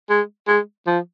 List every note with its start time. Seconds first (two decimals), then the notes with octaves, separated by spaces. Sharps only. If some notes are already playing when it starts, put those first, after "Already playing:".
0.10 G#3
0.48 G#3
0.87 F3